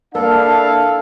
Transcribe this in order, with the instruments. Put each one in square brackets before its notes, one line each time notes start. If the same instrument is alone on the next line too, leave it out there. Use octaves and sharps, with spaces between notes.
[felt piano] A#3 [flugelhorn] D4 [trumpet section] E4 F5 [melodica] A4